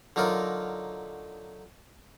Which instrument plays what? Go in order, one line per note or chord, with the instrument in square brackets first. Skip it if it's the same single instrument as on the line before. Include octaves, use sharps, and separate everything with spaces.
[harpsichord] D3 F#3 D#4 F4 A#4